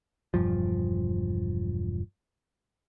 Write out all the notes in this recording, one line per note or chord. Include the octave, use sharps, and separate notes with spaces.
E1 G2 F3